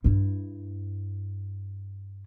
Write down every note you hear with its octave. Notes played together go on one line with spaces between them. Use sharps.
G2 E4